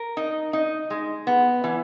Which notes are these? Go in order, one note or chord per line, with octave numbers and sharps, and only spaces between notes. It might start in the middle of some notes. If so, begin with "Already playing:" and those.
Already playing: A#4
D#4
D#4
G#3
B3
E3